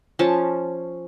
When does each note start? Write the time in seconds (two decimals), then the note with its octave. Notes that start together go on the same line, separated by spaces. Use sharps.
0.19 F3 C#4 C#5 A5